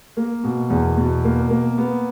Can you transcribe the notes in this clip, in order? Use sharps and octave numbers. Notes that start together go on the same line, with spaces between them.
A#3
B2
E2
B2
A#3
A#3
B3